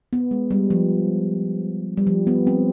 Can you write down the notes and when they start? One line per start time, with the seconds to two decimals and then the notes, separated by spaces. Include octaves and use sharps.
0.13 B3
0.31 G#3
0.51 G3
0.70 F3
1.97 G3
2.07 F3
2.27 B3
2.47 C4